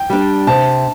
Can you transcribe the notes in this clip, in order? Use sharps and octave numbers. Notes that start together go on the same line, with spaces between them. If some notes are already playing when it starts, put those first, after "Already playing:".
Already playing: G5
G3 D4
C3 A5